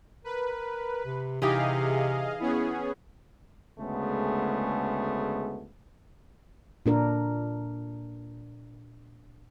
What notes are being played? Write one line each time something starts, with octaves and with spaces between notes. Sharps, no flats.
A#4 B4
C3
C3 E3 D#4 G4 G#4 D#5 F5
B3 C#4 E4 G#4
D2 C#3 G#3 A3 B3
A#2 D4 A#4